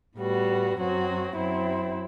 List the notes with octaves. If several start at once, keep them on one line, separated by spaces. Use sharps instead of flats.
A2 G3 B3 F#4
F#2 F#3 C4 F#4
F#2 F#3 C4 E4